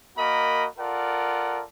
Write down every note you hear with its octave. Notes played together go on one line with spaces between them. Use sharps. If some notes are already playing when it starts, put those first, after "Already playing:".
A#3 F#4 A#4 D#5 B5
F4 A4 A#4 D5 F#5